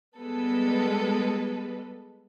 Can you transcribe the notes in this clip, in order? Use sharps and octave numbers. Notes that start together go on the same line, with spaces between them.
G3 G#3 B3 A4 B4